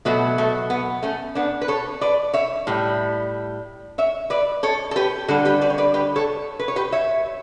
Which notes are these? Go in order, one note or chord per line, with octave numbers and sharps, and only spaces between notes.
B2 F#3 A3 B3
A3
B3
A3 C#4
B3 D4
B4
A4 C#5
B4 D5
C#5 E5
A2 G3
C#5 E5
B4 D5
A4 C#5
A4
G4 B4
D3 G3 F#4 A4
G4 B4
B4 D5
C#5
B4 D5
G4 B4
A4 C#5
B4
C#5
G4 B4
C#5 E5